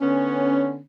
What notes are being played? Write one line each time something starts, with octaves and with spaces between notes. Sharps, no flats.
D3 B3 C#4